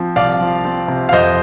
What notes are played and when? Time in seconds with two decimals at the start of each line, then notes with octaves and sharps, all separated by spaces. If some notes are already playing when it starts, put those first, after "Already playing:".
Already playing: F3 C4
0.16 C2 D5 F5
0.41 F3
0.65 C4
0.88 C3
1.09 F5
1.12 F2 C5 D#5